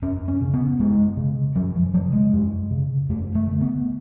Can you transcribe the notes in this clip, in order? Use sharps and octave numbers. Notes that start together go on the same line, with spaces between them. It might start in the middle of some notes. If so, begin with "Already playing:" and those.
F#2 C#4
C#4
C#3
B3
F#2 G#3
C#3
F#2 F#3
F3
C#3 F#3
G#3
F#2
C#3
F#2 A3
A3
D3
B3